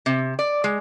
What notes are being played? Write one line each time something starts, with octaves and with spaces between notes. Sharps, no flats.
C3
D5
G#3